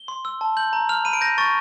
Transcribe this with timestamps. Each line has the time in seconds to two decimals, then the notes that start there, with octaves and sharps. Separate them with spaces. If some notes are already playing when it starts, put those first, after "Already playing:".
Already playing: G7
0.08 C6
0.25 E6
0.41 A5
0.57 G6 F#7
0.73 A#5
0.89 F6 F7
1.05 B5 D#7
1.13 D7
1.21 G6 A#6
1.38 C#6 A6